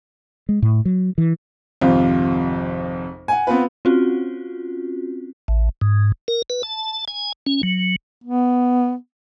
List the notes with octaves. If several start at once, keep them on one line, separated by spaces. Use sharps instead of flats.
G#3
A2
F#3
E3
G#1 F2 C3 F4
F#5 G#5
B3 C4 F4 B4
C4 C#4 F4 F#4
A1
G#2
A#4
B4
A5
G#5
C#4
F#3
B3